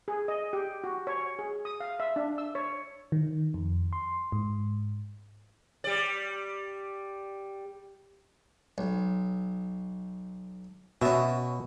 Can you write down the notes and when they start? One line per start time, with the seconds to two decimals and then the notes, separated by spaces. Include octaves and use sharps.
0.08 G#4
0.28 D#5
0.53 G4
0.84 F#4
1.07 C#5
1.39 G#4
1.65 D#6
1.80 F5
2.00 E5
2.16 D4
2.38 E6
2.55 C#5
3.12 D#3
3.54 F2
3.93 C6
4.32 G#2
5.84 G3 D5
8.78 B1
11.01 B2 C#4 F#4 E5